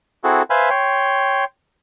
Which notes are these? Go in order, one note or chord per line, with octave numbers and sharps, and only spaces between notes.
C4 E4 F#4 G#4 A4
B4 C5 E5 F5 G#5 B5
C#5 G5 C6